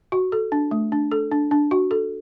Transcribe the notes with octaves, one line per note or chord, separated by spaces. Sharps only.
F#4
A4
D4
A3
D4
A4
D4
D4
F#4
A4